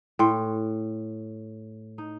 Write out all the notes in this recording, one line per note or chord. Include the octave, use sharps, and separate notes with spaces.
A2 G5 C6
D#4